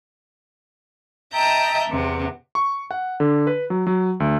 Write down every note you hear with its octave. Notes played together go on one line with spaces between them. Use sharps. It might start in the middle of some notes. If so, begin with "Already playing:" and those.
D#5 E5 G5 A5 A#5 G6
E2 C3 B3
C#6
F#5
D3
B4
F#3
F#3
D2